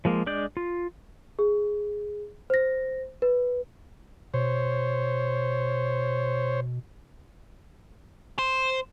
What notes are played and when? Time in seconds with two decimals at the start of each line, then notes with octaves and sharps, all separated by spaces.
0.05 F3 G#3 A#3
0.26 G#3 D4 D5 G6
0.57 F4
1.39 G#4
2.50 C5 A#6
3.22 B4
4.34 B2 C5 C#5
8.39 C5